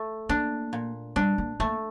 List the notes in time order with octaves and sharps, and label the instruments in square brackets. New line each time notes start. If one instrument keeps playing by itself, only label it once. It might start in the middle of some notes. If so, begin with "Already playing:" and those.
Already playing: [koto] A3
[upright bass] A#3 [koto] D4
[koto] A#2
[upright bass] G3 [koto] D4
[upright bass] A#3
[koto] A3 [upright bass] A#3